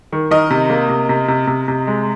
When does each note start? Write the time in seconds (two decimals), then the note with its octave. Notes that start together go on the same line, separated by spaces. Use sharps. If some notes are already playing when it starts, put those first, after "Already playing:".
0.13 D#3
0.31 D#3 A#4 D#5
0.50 C3
0.70 A#3
0.89 C3
1.09 C3
1.28 C3
1.47 C3
1.68 C3
1.87 G#3